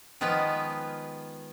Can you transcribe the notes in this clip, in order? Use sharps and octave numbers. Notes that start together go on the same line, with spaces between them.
D#3 F3 G#3 B3 F4 B4